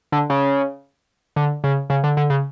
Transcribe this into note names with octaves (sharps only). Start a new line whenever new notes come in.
D3
C#3
D3
C#3
C#3
D3
D3
C#3